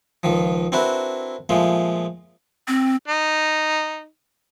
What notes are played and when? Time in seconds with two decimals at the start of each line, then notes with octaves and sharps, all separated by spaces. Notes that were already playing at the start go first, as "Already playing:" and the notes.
0.23 C#2 D#3 F3
0.72 C4 D4 E4 F#4 A#4 B4
1.49 A#2 F3 G#3 A3
2.68 C4
3.08 D#4